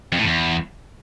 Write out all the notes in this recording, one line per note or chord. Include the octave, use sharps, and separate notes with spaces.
F2
A2
E2